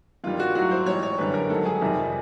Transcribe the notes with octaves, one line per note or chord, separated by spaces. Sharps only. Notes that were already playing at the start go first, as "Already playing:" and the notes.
G2 D#3 G3 F4
F#4
A2 F#3 F#4
C5
G#2 E3 G3 C#5
C#5
F#2 D3 G3 B4
A#4
G#2 D#3 F#3 A4
G#4
F2 C3 D#3 G3